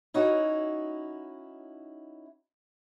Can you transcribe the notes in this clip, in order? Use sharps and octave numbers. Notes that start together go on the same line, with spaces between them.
C#4 D#4 E4 F#4